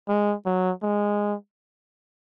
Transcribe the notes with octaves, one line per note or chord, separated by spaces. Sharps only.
G#3
F#3
G#3